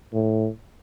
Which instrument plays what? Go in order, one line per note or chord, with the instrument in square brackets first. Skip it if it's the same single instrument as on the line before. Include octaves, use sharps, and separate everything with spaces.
[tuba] A2